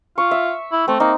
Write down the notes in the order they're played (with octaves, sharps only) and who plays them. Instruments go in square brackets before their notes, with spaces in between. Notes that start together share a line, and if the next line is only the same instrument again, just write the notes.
[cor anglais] F4 [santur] C#6
[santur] E5
[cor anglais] E4
[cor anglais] A3 [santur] C4
[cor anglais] A#3 [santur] D#4